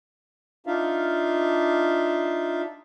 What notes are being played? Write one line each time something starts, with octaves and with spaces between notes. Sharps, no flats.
D4 D#4 F4 E5 F5